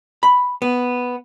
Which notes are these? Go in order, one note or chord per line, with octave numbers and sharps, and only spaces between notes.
B5
B3